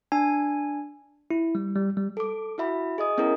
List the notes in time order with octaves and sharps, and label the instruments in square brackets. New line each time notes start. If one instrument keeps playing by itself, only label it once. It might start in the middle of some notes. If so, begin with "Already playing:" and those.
[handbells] D4 G#5
[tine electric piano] E4
G3
G3
G3
[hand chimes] A4 D6
E4 F#4 E5 B5
G#4 D#5 D#6
B3 C#4 E4 G#4 A#4